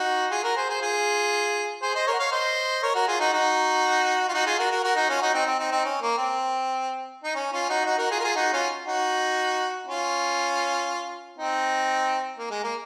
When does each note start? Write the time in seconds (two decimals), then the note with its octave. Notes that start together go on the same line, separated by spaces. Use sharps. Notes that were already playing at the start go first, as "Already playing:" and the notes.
Already playing: D#4 F#4
0.30 F4 G#4
0.43 F#4 A#4
0.56 G#4 C5
0.68 G#4 C5
0.81 F4 G#4
1.82 G#4 C5
1.95 C5 D#5
2.07 A#4 C#5
2.14 F#5
2.19 C#5 F5
2.32 C5 D#5
2.83 A#4 C#5
2.95 F#4 A#4
3.07 F4 G#4
3.20 D#4 F#4
3.33 D#4 F#4
4.29 F4
4.34 D#4 F#4
4.46 F4 G#4
4.59 F#4 A#4
4.71 F#4 A#4
4.84 F#4 A#4
4.96 D#4 F#4
5.09 C#4 F4
5.21 D#4 F#4
5.34 C4 D#4
5.46 C4
5.59 C4 D#4
5.71 C4 D#4
5.85 C#4
6.01 A#3
6.18 C4
7.24 D#4
7.35 C#4
7.53 C#4 F4
7.69 D#4 F#4
7.85 D#4 F#4
7.98 F#4 A#4
8.11 F4 G#4
8.20 A#4
8.24 F4 G#4
8.36 D#4 F#4
8.53 C#4 F4
8.87 D#4 F#4
9.87 C#4 F4
11.38 C4 D#4
12.39 A#3
12.51 G#3
12.64 A#3